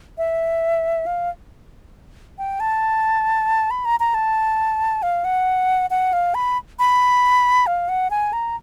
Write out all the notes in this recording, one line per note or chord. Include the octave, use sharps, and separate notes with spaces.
E5
F5
G5
A5
B5
A#5
A#5
A5
F5
F#5
F#5
F5
B5
B5
F5
F#5
G#5
A#5